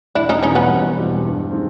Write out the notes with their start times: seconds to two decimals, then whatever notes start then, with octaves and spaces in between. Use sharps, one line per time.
0.15 E1 D4 E4
0.29 C#4 D#4
0.43 E2 B2 G3 C4 C#4 D#4
0.55 B3 C#4
0.70 E1
0.96 E2 B2 G3 C4
1.24 G2
1.51 D#3 G#3 C4